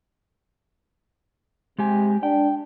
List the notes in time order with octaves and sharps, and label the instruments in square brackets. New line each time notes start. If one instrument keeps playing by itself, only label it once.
[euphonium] C3 [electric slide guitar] G#3 G4 G#5
[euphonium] D4 [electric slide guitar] G5